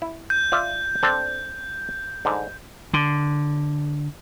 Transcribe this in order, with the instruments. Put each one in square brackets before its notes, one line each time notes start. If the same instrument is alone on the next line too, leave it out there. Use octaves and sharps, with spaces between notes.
[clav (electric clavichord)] E4
[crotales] G6
[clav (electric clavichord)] F4 D5 E5
C4 D4 A4
G#2 D3
[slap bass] D3